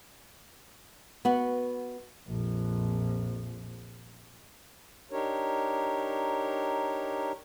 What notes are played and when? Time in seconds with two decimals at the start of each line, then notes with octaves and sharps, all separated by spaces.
1.25 B3 F#4
2.28 A#1 F2
5.11 D4 D#4 G4 A#4 C#5